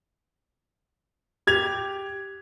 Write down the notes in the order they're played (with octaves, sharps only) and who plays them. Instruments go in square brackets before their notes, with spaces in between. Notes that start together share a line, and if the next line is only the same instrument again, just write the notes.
[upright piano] G4 G#6 F7